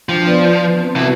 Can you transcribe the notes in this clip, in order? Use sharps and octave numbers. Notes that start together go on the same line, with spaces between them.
F3 D4 C5 G5
B3 B4 D5
C4 B4 A5
C3 B3 E4 F#4